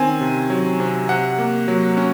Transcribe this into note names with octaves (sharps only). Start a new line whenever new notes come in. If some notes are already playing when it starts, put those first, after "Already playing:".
Already playing: D#3 C4 C#4 G#5
C3
F#3
C3
C3 F#5
A#3
F#3
C#4